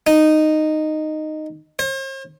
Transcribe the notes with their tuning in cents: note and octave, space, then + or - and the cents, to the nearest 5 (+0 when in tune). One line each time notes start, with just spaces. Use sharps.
D#4 -10
C5 +45